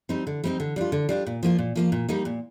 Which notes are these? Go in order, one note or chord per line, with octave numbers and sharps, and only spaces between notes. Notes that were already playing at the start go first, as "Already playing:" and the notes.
G3 C4 D#4
D3
G3 C4 D#4
D3
G3 D4 F4
D3
G3 D4 F4
A#2
F3 A#3 F4
A#2
F3 A#3 F4
A#2
G3 A#3 D#4
A#2